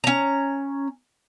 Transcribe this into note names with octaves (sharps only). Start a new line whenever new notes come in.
C#4 A#5